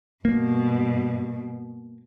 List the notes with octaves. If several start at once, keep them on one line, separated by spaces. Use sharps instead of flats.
G2 B2 A#3